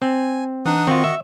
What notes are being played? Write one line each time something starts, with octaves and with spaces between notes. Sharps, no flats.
C4 G#5
E3 D4 D#4 F#5 D#6
D#3 C4 F4 F#4 D#5 C#6
E5